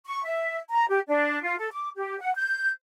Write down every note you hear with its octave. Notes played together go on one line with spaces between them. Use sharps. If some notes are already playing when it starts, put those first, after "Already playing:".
C#6
E5
A#5
G4
D4
F4
A4
D6
G4
F#5
G6